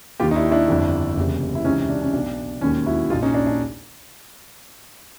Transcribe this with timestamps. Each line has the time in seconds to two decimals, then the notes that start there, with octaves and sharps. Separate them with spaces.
0.20 D#2 F4 G4
0.23 D#3
0.31 D#4
0.36 D4 E4
0.51 D4 E4
0.68 G1 F2 D3
1.16 F#1 E2 C3
1.55 E4
1.65 C#2 C3 E3 C#4 D#4
1.90 D4
2.02 C#4
2.13 B1 B2 D4
2.61 E1 D#2 D#3 C#4
2.86 E4 F#4
3.10 A#1 A#2 D#4 F4
3.22 C#4 D#4
3.34 D4
3.47 D4